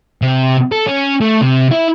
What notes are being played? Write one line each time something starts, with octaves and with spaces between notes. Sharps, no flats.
C3
A4
C#4
A3
C3
E4